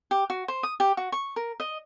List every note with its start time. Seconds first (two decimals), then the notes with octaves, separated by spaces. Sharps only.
0.11 G4
0.30 F#4
0.48 C5
0.63 D#6
0.80 G4
0.97 F#4
1.12 C#6
1.36 A#4
1.60 D#5